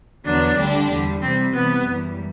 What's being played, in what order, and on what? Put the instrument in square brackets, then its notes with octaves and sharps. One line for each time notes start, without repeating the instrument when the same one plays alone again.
[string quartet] E2 D3 F#3 B3 [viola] D4
[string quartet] D2 D3 G3 D4 G4
E2 D3 G3
[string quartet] C3 E3 G3 [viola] C4
[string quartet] C3 E3 G3 [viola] B3
[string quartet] F#2 E3 G3